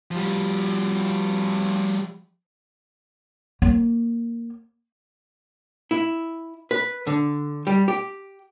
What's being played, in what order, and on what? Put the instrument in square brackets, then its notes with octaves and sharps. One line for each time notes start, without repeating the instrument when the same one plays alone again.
[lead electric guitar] F3 G3
[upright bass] A#3
[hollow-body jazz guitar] E4
B4
D3
G3
G4